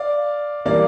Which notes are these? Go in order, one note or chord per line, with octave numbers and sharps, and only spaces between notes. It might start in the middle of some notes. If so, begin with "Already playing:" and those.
Already playing: D5 F5
E3 G3 A#3 D5 F5